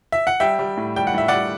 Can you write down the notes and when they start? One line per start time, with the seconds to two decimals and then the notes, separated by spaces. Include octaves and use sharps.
0.12 E5
0.27 F#5
0.40 G3 E5 G5
0.59 G3
0.78 A2
0.96 G3 G5
1.07 F#5
1.14 A2 E5
1.28 G3 D5 F#5